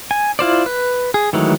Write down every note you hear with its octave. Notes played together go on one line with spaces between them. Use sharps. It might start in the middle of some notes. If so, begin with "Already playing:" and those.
G#5
E4 F4 C5 D5
B4
G#4
D#3 E3 F#3 G#3 A3